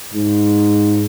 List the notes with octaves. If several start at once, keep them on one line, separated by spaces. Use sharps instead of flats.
G#2